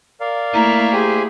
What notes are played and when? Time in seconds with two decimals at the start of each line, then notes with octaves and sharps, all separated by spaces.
0.20 A#4 D5 F5
0.53 A3 A#3 E4 A#5
0.93 G4 G#4 C5 G#5